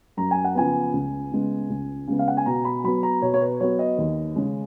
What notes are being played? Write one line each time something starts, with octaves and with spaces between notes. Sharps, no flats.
F#2 A#5
G#5
F#5
C#3 F3 B3 G#5
C#2
C#3 G#3 B3
C#2
C#3 G#3 B3
F5
F#5
G#5
B2 A#5
B5
F#3 B3 B5
A#5
B2 C#5
C#5
B4
F#3 B3 C#5
D#5
D#2
C#3 G#3 C#4